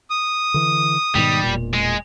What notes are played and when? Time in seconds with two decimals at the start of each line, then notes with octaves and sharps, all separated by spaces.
0.10 D#6
0.54 D3 E3
1.15 G#2 B2 D#3 G3
1.43 E1 A#2
1.73 G#3